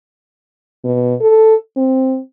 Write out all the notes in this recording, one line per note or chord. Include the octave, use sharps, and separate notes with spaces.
B2
A4
C4